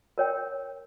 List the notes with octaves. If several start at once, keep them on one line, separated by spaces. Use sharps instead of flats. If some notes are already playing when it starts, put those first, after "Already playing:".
A#4 C#5 G5